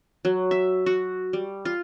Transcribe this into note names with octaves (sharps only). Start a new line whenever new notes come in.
F#3
E5
F#4
G3
F4